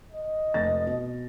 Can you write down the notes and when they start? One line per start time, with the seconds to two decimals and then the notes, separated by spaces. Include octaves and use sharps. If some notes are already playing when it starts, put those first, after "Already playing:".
0.12 D#5
0.54 F1 A6 A#6
0.87 B2